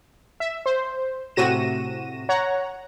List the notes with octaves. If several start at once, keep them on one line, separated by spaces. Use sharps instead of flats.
E5
C5
A2 C3 F#4 A#6 D#7 E7
C#5 F#5 A#5